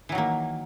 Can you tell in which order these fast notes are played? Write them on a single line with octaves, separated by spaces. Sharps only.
E3 F#3 D#3 A#3